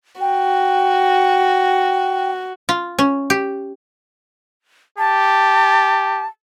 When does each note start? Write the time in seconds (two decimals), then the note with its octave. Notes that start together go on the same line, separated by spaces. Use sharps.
0.21 F#4 G5
2.69 F4
2.99 C#4
3.30 G4
4.98 G4 A5